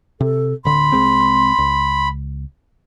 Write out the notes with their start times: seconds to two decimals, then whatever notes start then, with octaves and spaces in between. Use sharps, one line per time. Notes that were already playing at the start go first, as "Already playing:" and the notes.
0.21 C3 A4
0.65 D1 D3 B5 C6
0.92 C2 G#3 C4
1.58 C#2